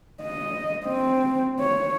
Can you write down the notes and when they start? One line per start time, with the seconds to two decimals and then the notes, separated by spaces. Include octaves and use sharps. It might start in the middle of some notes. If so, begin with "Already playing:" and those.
0.22 D#5
0.86 C4
1.60 C#5